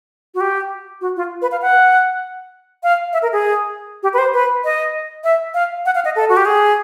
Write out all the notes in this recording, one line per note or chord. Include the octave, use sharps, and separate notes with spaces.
F#4
G4
F#4
F4
B4
F5
F#5
F5
E5
A#4
G#4
G4
B4
C5
B4
D#5
E5
F5
F#5
F5
D#5
A4
F#4
G4
G#4